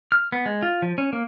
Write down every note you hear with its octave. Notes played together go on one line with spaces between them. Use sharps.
F6
B3
G#3
F4
F3
C#4
A#3